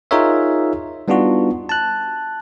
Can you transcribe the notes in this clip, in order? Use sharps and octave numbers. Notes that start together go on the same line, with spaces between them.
D#4 F4 G#4 A#4 C#5 E5
G3 B3 D4 D#4 F4 F#4
A5 F#6